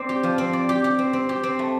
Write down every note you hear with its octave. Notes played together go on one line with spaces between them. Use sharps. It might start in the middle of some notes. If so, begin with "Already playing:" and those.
Already playing: C4 D5
G4
F3
C4
D5
G4
G4
C4
C4
G4
C4
A3